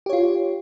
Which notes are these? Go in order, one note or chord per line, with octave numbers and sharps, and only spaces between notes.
F4 G4 C#5